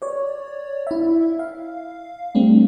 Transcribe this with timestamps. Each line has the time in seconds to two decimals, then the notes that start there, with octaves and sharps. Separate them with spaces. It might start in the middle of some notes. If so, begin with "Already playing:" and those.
0.02 C#5 D5
0.87 E4 E5
1.39 F5
2.35 G3 A3 C4 D4